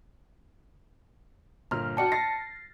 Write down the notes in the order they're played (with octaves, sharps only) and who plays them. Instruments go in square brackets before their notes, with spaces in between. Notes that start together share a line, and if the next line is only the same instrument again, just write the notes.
[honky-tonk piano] G1 A#2 F6 [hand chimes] A#5
[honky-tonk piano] F#4 D5 G5 [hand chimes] A5 C#7
[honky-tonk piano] A6 A#6 [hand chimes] C7